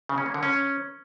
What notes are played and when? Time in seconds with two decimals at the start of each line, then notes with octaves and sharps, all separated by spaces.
0.09 C#3
0.18 C#4
0.26 A#3
0.34 D3
0.43 C#4